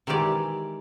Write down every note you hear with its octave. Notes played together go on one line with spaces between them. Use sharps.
D#3 E3 G#3 G4 D5